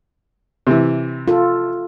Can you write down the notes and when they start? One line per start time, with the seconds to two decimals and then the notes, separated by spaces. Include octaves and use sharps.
0.67 C3 E3
1.28 F4 A4